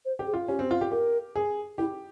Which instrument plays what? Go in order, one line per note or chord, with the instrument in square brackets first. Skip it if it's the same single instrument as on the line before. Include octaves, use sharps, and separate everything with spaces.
[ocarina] C5
[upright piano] G4
[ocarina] G#4
[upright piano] F4
[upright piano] C#4 [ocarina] G4
[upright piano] C4
F4
G4
[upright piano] G4 [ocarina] A#4
[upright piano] G#4
[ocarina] E4 [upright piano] G4